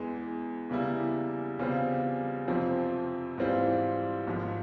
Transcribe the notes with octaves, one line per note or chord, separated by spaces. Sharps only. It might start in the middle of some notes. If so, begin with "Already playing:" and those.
Already playing: E2 E3 G#3
E2 C#3 G3 A#3 E4
E2 C#3 G3 C4 F4
F2 C3 F3 C4
G#2 E3 G3 C4 F4
G#1 G#2 F3